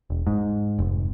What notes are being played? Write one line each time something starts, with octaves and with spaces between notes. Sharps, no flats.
E1
G#2
F1